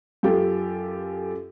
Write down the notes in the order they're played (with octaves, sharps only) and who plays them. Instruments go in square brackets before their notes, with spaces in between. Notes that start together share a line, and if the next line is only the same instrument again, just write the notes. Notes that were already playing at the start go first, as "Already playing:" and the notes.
[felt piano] F#2 F4 G4 A4